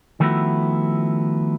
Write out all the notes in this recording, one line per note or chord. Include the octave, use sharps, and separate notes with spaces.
D#3 F3 A3 B3 E4 F#4